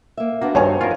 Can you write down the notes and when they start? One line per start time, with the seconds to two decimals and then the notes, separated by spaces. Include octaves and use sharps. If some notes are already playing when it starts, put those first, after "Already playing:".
0.17 A#3 E5
0.42 A#3 B3 D4 F#4
0.55 G2 D#3 C5 C#5 G#5
0.81 F2 D#3 F4 A#4